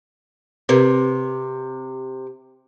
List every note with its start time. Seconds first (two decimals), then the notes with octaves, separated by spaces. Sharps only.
0.69 C3 C4 A#4 B4